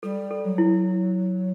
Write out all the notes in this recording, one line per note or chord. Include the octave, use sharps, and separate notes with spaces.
G3 A4
A4
F#3
E4